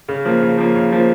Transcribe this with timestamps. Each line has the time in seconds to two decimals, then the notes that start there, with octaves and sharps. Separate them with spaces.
0.09 C#3
0.25 F3 A#3
0.43 C#3
0.58 F3 A#3
0.76 C#3
0.92 F3 A#3